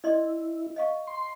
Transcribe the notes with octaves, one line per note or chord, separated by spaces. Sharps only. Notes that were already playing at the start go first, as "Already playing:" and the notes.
E4 D5 D#5 C6
D#5 F5 C#6
C6